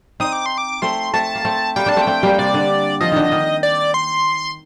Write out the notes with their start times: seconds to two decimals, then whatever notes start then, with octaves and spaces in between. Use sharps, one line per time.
0.20 C4 D#4 D#6
0.32 D6
0.46 C6
0.58 D6
0.82 A3 C4 C6
1.14 A3 C4 A5
1.35 A#3
1.45 A3 C4
1.76 G3 A#3 G5
1.86 A#3 D4 A5
1.97 A3 C4 G5
2.07 A3 C4
2.23 G3 A#3
2.39 C3 D5
2.54 D3
3.00 F3 D#5
3.12 D3 D#3
3.32 D#3
3.63 D5
3.94 C6